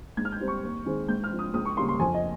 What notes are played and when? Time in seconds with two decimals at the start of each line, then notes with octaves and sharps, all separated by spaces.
0.17 G#2 G#6
0.25 F6
0.32 G6
0.40 G3 C4
0.48 C#6
0.63 D#2
0.86 D#3 G#3 C4
1.08 G#2 G6
1.24 F6
1.31 F3 C4
1.39 D#6
1.54 C#2 D#6
1.65 C#6
1.77 C#3 G3 A#3 C6
1.89 C6
2.00 F2 G#5
2.14 D#5